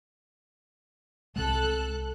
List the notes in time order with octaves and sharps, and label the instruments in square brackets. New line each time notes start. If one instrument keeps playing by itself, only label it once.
[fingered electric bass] C2 C3 G#3 [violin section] A4 F#6